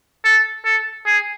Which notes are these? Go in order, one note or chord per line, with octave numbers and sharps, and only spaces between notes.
A4
A4
G#4